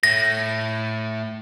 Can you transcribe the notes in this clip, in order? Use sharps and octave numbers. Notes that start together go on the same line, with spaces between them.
A2 A#6